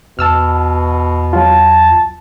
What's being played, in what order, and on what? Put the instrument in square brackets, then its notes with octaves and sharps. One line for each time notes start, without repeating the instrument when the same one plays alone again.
[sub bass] E2 [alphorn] B2 [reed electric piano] A5 E6 F6
[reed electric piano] F#3 F4 [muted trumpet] A5